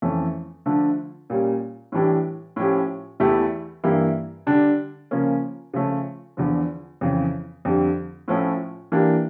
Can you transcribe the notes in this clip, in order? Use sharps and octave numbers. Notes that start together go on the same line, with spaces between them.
F2 E3 A3 C#4
D3 F3 A3 D4
A#2 G3 C#4
A2 E3 G3 D4 G4
A2 F3 C#4 G4
E2 E3 A3 E4 G4
G2 E3 A#3 E4 G4
D3 G3 D4 G4
C#3 F3 A#3 C#4
C#3 F3 A3 C#4
E2 D3 F3
F2 C#3 E3
F2 D3 G3
A2 F3 A3 C#4
E3 A#3 D4 G4